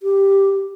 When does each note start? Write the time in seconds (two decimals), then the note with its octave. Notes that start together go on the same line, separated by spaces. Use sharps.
0.03 G4